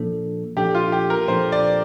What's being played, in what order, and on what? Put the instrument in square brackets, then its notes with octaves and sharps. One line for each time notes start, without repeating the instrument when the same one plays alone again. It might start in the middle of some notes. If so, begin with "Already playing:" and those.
Already playing: [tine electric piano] A#2 F3 A#3 D4 A4
[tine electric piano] A#2 F3 A#3 D4 A4 [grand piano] G4
[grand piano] F4
G4
A#4
[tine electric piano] A#2 F3 A#3 D4 A4 [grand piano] C5
[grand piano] D5